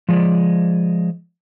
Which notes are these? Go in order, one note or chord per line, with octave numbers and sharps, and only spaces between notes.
F3 G#3 D5